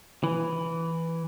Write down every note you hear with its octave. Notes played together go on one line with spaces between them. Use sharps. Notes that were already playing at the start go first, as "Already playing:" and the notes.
E3